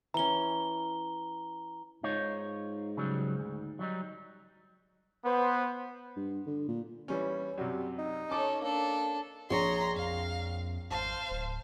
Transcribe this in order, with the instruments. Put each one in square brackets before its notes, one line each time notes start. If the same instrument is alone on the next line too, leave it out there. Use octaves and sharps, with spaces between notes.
[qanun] E3 C#4 [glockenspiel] A#5 G7
[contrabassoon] G#2 [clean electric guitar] D#4 F4 C#5
[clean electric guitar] C#3 F#3 G3
D2
F#3 G3 D#4
[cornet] B3 [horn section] B4 C5
[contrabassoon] G2
D3
A#2
[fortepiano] E3 G3 C#4
[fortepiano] F#2 C3 [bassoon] G3
[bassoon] D#4
[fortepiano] C#4 D6 [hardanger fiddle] A4 C#5
[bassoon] A#3 [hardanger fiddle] D4 A4
[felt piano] A#1 [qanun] G#4 C#5 [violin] A#5 C6
[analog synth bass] F2 [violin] F5
[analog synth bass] G#1 [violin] C5 F5 [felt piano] A5
[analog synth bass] D1